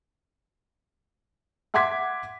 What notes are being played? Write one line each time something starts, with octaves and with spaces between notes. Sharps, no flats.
E5 F#5 C6 D6 G#6 B6